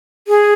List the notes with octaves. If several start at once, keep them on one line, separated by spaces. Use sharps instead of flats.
G#4